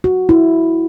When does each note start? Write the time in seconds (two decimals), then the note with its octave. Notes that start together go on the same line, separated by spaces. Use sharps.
0.04 F#4
0.29 E4